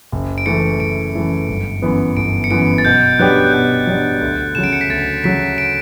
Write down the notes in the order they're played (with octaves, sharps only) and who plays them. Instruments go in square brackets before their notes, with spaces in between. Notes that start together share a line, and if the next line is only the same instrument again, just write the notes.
[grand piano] F#1
[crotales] D7
[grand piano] F#2 E3 A3 E4 [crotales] C#7
[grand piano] F#1 [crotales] D7
[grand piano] F#2 E3 A3 E4
G1
F#2 E3 B3
[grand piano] G1 [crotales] D7
[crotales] C#7
[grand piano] F#2 E3 B3 [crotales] D7
[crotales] A6
[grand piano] B2 [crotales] G6
[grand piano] F#3 B3 D4 G4 [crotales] F#6
[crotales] F#6
[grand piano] B2 [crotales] G6
[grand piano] F#3 B3 D4 G4
D2
[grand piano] C#3 F#3 [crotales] E7
[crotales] D7
C#7
B6
[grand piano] D2 [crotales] A6
[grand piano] C#3 F#3 [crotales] B6
[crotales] D7